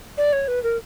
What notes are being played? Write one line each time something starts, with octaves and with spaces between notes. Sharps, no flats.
D5
C#5
B4
A#4